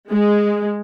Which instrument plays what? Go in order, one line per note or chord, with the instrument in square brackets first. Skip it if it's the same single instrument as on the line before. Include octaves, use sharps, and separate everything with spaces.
[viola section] G#3